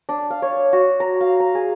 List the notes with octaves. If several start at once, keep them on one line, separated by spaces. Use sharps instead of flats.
D4
F5
C#5
F#4
A#5
F5
A#5
G#4